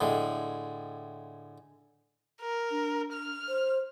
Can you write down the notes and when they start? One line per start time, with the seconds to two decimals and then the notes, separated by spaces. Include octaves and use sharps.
0.01 A2 D3 G#3
2.41 A#4
2.71 D4
3.13 F6
3.48 C5